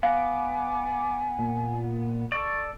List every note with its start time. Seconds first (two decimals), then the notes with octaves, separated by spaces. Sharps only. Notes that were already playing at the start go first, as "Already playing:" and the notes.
0.03 B3 F5 G#5 D6
1.39 A#2
2.32 A4 D5 C#6